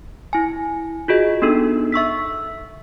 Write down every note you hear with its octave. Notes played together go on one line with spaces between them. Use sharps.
E4 G#5
F4 F#4 G#4 D#5
B3 D4 D#4 A4
E5 C#6 E6 B6